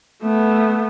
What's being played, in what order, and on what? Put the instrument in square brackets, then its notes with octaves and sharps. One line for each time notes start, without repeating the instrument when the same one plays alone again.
[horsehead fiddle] A3 B3